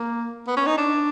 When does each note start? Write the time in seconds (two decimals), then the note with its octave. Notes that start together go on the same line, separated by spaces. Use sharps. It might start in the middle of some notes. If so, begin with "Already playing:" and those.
Already playing: A#3
0.47 B3
0.57 C#4
0.67 D#4
0.77 D4